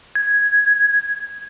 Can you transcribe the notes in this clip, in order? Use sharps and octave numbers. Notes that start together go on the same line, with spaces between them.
G#6